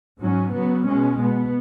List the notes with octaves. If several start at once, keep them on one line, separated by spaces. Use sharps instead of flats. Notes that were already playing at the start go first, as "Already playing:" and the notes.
G#2 F#3 C#4
C#3 F#3 B3
B2 G#3 C#4
B2 B3